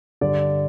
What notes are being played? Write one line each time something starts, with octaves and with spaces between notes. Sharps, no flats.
G2 D3 D5